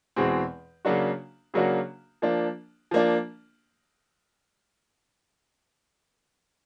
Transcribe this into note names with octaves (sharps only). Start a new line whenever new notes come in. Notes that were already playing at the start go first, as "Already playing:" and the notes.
E2 B2 G#3 C4
C#3 F#3 A#3 D4 F#4
C#3 F#3 A#3 D4 F#4
F3 A#3 D4
F3 A#3 D4